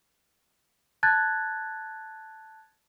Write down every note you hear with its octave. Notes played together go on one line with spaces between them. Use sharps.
A5 F#6 G#6 A6